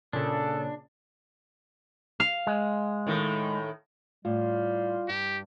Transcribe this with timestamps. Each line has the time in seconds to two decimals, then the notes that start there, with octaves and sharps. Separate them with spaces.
0.13 A#2 C#3 D4 A4
2.20 F5
2.47 G#3
3.07 A2 D#3
4.25 A2 G3 F4
5.08 G2 G4